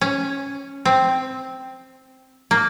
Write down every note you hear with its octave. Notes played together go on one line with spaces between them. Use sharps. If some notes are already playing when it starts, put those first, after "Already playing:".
C#4
C4
A#3